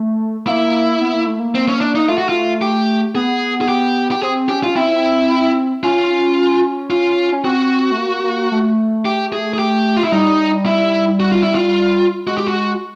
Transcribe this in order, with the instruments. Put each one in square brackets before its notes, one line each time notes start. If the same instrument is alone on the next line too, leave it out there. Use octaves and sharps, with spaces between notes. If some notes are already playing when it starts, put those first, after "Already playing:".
Already playing: [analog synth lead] A3
[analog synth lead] A#3 [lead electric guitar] E4
[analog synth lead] B3
A#3
A3
A#3
[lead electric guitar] C4
C#4
D4
D#4
[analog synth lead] A3 [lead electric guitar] F4
[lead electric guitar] F#4
F4
G4
[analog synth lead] B3 [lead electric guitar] G#4
[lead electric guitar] G#4
G4
G4
[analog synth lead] C4 [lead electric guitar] G#4
[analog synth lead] C#4 [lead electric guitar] G4
[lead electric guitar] F4
[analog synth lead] C#4
[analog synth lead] C4 [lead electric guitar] E4
[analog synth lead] C#4 [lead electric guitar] F4
[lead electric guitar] F4
[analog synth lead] C#4
[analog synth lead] C4 [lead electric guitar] F#4
[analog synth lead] A3
A#3
A#3
A3
[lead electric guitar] G4
G#4
G#4
G4
F4
E4
[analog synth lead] G3 [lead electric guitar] D#4
[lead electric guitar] E4
F#4
F4
E4
F4
[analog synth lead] G#3 [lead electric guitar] F#4
[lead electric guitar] G4
F#4